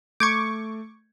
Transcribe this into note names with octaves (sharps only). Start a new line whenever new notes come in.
A3 C#6 D6 G6 G#6 C#7